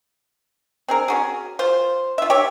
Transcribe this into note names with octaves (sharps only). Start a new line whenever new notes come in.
C4 G#4 A#4
C#4 F#4 G#4
F4 C5
F4 E5
G4 C#5 E5